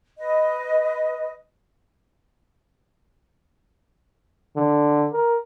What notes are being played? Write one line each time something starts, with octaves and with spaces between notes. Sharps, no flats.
B4 D#5
D3
A#4